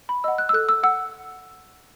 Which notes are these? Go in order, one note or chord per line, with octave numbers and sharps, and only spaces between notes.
B5
D#5 F#5 E6
F#6
E6
A4 F#6
E6
F#5 E6